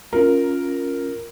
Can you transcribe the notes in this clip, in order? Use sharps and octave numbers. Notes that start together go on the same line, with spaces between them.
C#4 F4 A#4 A#5